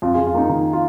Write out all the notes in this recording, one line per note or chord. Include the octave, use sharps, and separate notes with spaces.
F2 F4
F4 G#4
F2
F4
A#3 D#4
D#3 D#4
F4